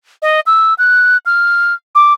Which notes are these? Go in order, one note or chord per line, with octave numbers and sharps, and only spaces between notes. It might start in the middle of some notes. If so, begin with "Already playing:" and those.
D#5
E6
F#6
F6
D6